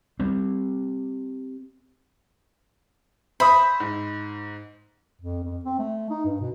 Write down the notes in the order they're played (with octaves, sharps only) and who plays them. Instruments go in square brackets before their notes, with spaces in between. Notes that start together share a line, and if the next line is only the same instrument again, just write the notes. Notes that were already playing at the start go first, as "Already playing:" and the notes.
[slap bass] G3 C4
[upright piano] C5 E5 D#6 [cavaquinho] B5
[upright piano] G#2
[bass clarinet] F2
F2
C4
A3
D#4
G2
B2